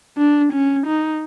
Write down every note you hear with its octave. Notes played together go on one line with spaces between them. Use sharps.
D4
C#4
D#4